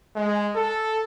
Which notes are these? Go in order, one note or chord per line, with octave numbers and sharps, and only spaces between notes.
G#3
A4